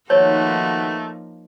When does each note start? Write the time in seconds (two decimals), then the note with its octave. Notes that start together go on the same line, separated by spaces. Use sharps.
0.10 D#3 F3 A3 A#3 D#4 F#4 B4 C#5